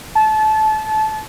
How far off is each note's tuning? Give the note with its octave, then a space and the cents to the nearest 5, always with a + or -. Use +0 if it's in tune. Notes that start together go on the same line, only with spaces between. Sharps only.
A5 -25